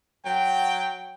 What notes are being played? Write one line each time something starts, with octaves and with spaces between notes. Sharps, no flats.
F#3 G5